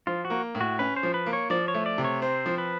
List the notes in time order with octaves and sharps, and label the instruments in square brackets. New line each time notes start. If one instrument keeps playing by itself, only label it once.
[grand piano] F3 [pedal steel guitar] F4
[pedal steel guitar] F#4
[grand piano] A#3
A2
[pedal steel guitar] F#4
[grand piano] C#4 [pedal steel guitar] B4
[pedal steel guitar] C5
[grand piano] F3
[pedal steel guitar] B4
[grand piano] A#3
[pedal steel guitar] C#5
[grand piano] F3 [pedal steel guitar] D5
[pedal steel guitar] C#5
[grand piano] A3
[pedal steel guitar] D5
[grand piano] C3
[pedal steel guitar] C#5
[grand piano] C4 [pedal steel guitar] C5
[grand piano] F3
[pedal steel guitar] B4